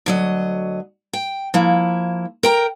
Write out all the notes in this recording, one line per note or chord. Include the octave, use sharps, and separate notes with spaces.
D2 F#3 D#5
G5
F3 A#3 E4
A#4 G5 A#5